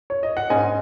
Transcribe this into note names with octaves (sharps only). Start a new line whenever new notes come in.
C#5
D#5
F#5
G#2 G#3 C#4 D#5 G#5